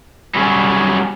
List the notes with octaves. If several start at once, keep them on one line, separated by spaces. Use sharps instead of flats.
F#3 G3 C#4 G#4